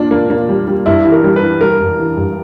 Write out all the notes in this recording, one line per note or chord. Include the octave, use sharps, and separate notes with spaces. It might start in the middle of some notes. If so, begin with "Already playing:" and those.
Already playing: A#2 D4
A#3
A#3
G3
G3
G2 E4
E3
A#4
G3
B4
E3
G3 A#4
G2
E3
G2